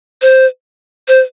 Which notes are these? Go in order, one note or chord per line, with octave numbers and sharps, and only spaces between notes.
C5
C5